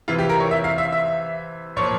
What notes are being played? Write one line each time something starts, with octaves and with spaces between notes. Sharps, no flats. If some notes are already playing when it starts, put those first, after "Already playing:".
C3 E3 F4
G4
A#4
C#5
E5
F5
E5
E5
A#2 F3 C#5